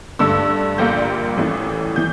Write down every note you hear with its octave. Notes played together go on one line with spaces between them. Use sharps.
G2 D3 A3 E6
A#1 A#2 G3 A#3 G6
A1 A2 E3
E3 G6